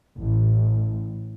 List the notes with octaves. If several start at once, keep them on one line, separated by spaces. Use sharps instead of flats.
A1